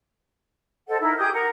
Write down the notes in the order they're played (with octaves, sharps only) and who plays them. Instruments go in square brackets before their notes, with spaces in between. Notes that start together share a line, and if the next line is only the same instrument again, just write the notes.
[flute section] A4 C5 D#5 F#5
D#4 E4 A#4
G4 G#4 D#6 G6
A#4 F#5